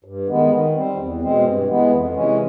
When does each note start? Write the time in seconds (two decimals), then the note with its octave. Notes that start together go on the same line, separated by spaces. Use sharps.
0.04 G2
0.28 D#3 G#3 B3
0.50 D#3
0.75 G3 C4
0.98 E2
1.21 B2 G#3 C4
1.44 G2
1.68 E3 G#3 B3
1.91 F2
2.14 C3 E3 G#3 C#4